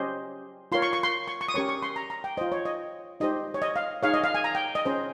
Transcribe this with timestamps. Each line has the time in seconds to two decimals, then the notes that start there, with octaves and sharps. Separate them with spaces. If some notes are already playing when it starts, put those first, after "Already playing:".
Already playing: C#4 G4 C5 D#5
0.72 F4 A#4 C#5 C6
0.82 C#6
0.93 C#6
1.03 C6
1.28 C#6
1.41 C#6
1.48 D#6
1.54 C#4 G4 A#4 C#5 C#6
1.69 C#6
1.82 C6
1.96 A#5
2.10 A#5
2.24 G5
2.37 F4 C5 D#5
2.52 C#5
2.65 D#5
3.20 D#4 G4 C5 D#5
3.54 C#5
3.62 D#5
3.76 F5
4.03 D#4 G#4 C#5 F5
4.14 D#5
4.24 F5
4.34 G#5
4.44 A#5
4.55 G5
4.75 D#5
4.85 C#4 G#4 C5